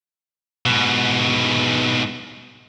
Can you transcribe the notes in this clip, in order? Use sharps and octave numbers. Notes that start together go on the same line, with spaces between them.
G#2 B2